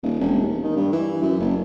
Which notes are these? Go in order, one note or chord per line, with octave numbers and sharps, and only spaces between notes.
D#1
E1
D#2
D#3
G2
E3
F#2
F#1